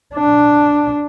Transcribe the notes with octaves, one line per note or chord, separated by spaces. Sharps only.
D4